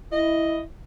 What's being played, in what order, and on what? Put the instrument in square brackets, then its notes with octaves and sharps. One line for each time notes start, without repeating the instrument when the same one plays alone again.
[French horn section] E4 [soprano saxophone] D#5